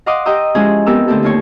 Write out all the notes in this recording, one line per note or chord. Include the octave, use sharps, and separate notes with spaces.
D#5 F5 F#5 C6 D6 D#6
G4 D#5 G5 A#5 D#6 E6
F3 G#3 C#4 E4 G#4 C5
B3 C4 G4 A#4 E6
D3 A3 C4 E4 G4 A4
D#2 F4 C#5